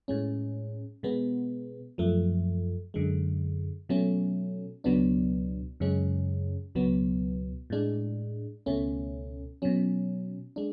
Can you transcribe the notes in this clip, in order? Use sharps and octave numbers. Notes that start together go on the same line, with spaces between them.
A2 G#3 C#4
B2 G#3 B3
F#2 F3 A3
F#2 D3 G#3
B2 F#3 A3 C#4
C#2 B2 F#3 B3 D4
F#2 C#3 G#3 C#4
C#2 B2 F#3 B3
A2 G#3 D4
C#2 B2 A3 C#4
B2 F#3 C#4
G#3 D4